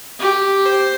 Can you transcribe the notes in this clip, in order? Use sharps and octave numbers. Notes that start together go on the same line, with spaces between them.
G4
C5